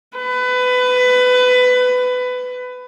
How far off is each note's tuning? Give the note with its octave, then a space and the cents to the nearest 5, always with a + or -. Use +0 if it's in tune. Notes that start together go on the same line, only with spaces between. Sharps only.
B4 +20